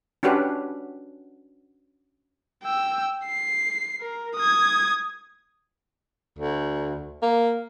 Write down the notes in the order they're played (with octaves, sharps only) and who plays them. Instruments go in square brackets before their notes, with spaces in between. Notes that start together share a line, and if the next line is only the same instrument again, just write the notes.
[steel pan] C#4 D4 F#4 G4 B4
[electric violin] G5 E6
C7
A#4
D#6 G#6
[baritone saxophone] D2
A#3